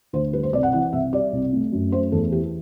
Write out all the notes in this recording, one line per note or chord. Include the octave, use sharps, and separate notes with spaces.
D2 C5
G3 B4
C5
C2 D5
F#5
E3 F#5
C2 E5
G3 D5
C2
A3
F#2
A3 C5
E2 A4
E3 G4